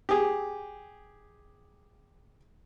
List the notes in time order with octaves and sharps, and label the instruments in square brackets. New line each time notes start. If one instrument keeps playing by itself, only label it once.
[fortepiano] G4 G#4